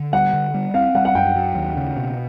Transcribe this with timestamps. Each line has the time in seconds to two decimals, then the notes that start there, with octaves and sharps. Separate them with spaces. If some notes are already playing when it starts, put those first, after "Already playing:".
Already playing: D3
0.13 G3 F#5
0.33 D3
0.54 G3
0.74 C4 F5
0.95 G3 F#5
1.05 F#5
1.15 F#2 G5
1.36 F#3
1.56 D#2
1.77 C#3
1.97 B2